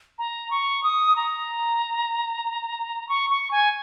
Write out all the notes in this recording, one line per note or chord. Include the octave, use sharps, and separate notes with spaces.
A#5
C#6
D#6
A#5
C#6
C#6
G#5